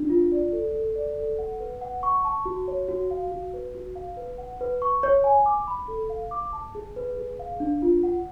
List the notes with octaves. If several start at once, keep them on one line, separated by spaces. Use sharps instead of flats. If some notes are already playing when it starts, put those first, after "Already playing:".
Already playing: D4
F4
D5
A4
A4
D5
A4
F#5
B4
F#5
C#6
A5
F#4
C#5
F#4
F5
F#4
B4
F#4
F5
B4
F#5
B4
C#6
C#5
G#5
D6
B5
A4
F5
D6
A5
G#4
B4
G#4
F5
D4
F4
F#5